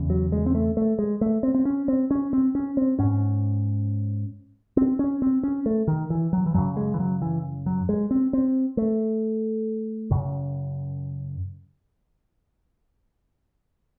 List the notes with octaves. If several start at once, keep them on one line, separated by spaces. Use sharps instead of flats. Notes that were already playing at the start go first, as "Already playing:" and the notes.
Already playing: E2 C#3
F#3
G#3
C4
A3
A3
G#3
A3
C4
C4
C#4
C4
C#4
C4
C#4
C4
G#2 C#4
C4
C#4
C4
C#4
A3
D#3
E3
F#3
E3
F#2 C#3 F#3
G#3
E3
F#3
E3
F#3
G#3
C4
C4
A3
F#2 C#3